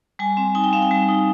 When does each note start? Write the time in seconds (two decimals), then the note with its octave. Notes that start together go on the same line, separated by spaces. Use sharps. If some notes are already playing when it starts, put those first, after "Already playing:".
0.19 G3 G#5
0.37 C4
0.55 D#4 G#5
0.64 G5
0.73 C4 F5
0.82 G5
0.91 G3 G#5
1.09 D#4